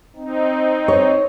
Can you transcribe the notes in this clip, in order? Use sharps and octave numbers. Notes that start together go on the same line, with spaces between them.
C4 D#4
C#5